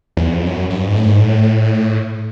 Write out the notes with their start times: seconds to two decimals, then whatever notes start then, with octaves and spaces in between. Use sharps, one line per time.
0.17 E2
0.31 F2
0.47 F#2
0.70 F#2
0.75 G2
0.86 G#2
0.96 A2
1.05 G#2
1.20 A2